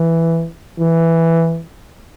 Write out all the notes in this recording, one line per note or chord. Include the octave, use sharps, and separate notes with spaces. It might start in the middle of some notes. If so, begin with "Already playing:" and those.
Already playing: E3
E3